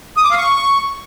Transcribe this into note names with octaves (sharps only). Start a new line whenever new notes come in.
D#6
D6
F5
C#6